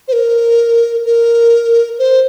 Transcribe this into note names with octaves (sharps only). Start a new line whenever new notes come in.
C5
A#4
A#4
C5